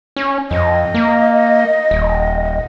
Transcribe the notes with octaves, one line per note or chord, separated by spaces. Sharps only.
C#4
F2 D#5
A#3
D#1